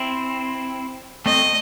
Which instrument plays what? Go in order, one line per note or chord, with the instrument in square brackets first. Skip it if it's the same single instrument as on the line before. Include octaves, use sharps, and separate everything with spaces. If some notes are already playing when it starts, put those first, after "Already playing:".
Already playing: [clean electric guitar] C4 E4
[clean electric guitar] A3 C4 [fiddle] D#5